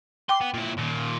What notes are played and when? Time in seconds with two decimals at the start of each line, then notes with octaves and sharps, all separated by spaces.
0.29 G5 C6 D6
0.41 B3
0.54 A#2 E4
0.78 D#2 A#2